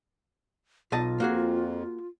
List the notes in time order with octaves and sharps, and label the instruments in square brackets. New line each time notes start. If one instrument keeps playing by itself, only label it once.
[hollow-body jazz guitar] B1 D#5 A5 [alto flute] F4
[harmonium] F2 [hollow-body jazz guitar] A#3 F#4 G#4